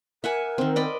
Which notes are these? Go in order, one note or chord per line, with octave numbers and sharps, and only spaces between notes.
A#4 E5 F#5 G#5
D#3 C4
D5 D#5 B5